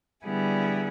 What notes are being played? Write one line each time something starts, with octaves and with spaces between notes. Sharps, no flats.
D3 G3 B3 E4 G#4